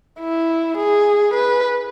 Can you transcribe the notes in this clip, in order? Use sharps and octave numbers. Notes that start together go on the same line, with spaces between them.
E4
G#4
B4